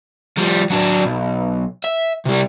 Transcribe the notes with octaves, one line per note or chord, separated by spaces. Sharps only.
F3 G3
F#3 D4
B1
E5
C3 G3